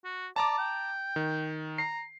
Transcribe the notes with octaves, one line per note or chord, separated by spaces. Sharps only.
F#4
D5 A5 A#5 D6
G5
D#3
A#5 C7